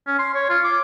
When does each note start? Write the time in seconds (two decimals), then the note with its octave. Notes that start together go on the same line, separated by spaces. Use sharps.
0.07 C#4
0.19 C6
0.34 C#5
0.50 F4
0.64 D6